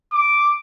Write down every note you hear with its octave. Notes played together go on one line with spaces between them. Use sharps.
D6